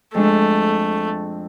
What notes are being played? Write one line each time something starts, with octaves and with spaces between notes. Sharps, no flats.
F2 G#3 A3 D4